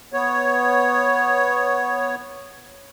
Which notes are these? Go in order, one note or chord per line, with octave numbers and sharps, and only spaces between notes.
B3 C#5